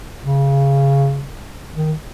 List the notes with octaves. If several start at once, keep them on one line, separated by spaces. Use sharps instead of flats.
C#3
D#3